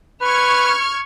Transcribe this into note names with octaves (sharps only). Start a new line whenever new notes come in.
B4 C#6 F6 G#6